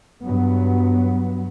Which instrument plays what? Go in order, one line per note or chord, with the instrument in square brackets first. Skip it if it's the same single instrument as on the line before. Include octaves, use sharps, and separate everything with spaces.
[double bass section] G2 F#3 B3